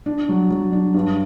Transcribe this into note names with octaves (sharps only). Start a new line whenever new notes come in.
D4
F#3
F#3
D4
G2